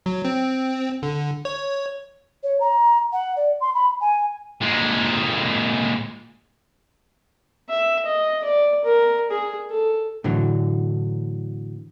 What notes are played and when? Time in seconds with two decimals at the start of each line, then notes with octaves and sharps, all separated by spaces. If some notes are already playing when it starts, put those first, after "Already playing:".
0.06 F#3
0.25 C4
1.03 D3
1.45 C#5
2.43 C#5
2.60 A#5
3.13 F#5
3.36 D5
3.61 C6
3.75 B5
4.01 G#5
4.61 A#2 G#3
7.70 E5
8.05 D#5
8.44 D5
8.84 A#4
9.31 G#4
9.70 A4
10.24 A2 D3 E3 F#3